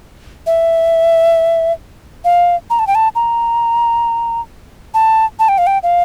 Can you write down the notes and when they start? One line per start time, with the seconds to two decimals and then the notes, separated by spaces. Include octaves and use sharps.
0.47 E5
2.25 F5
2.70 A#5
2.79 A5
2.87 G5
2.95 A5
3.15 A#5
4.94 A5
5.39 A5
5.49 G5
5.58 F5
5.67 G5
5.83 F5